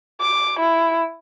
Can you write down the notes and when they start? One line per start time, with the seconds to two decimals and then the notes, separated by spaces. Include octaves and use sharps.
0.21 D6
0.59 E4